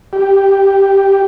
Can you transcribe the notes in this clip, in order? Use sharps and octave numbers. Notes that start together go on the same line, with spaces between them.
G4